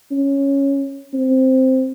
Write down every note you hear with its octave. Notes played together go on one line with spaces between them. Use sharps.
C#4
C4